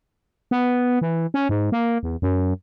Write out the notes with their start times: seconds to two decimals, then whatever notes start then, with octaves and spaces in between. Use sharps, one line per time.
0.51 B3
1.02 E3
1.34 C#4
1.49 G#2
1.72 A#3
2.03 E2
2.22 F#2